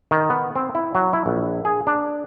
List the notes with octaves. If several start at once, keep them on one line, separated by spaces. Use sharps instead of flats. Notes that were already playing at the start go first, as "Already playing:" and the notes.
D#3
B3
C4
E4
F#3
E4
A#1
G#4
D4